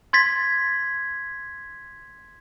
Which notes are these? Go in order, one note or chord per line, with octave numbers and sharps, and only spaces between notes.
C6 G#6 A6 B6